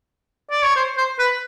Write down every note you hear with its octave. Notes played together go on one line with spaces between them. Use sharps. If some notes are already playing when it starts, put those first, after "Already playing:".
D5
C#5
C5
C5
B4